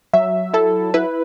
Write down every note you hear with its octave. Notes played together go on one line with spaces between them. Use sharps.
F#3 E5
E4 A4
E4 B4